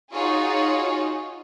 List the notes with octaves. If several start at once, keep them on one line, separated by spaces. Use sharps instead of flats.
D#4 F4 F#4 G#4 C#5